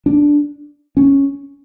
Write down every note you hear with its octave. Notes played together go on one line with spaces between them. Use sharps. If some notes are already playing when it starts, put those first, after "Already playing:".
D4
C#4